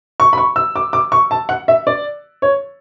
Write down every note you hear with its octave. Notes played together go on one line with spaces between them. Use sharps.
C#6
B5
C#6
E6
D6
D6
C#6
A5
F#5
E5
D5
C#5